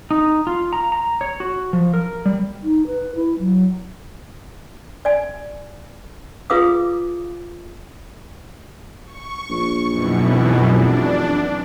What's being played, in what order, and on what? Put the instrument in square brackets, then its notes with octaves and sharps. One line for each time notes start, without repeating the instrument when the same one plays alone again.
[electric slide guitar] D#4
F4
A#5
A#5
C#5
F#4
F3
A#4
G3
[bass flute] D#4
B4
E4
F#3
[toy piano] D5 G#5
F4 G#4 B4 F5 D6 D#6
[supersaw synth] C#6
[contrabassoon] A#1
[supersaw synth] F#2 B2 E3
[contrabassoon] F1
[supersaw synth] D4